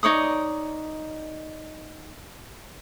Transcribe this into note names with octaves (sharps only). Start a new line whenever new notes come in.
D#4 C#5 D5 D#6